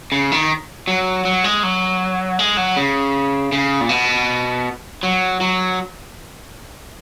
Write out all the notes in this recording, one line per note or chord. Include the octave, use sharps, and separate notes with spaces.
C#3
D#3
F#3
F#3
G#3
F#3
G#3
F#3
C#3
C#3
A#2
B2
F#3
F#3